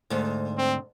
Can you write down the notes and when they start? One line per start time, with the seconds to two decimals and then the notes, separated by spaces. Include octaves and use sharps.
0.10 D2 G#2
0.58 C4